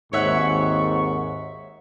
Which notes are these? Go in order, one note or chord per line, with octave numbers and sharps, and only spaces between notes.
G#1 D#2 G#2 C#5 E5 F#5 C#6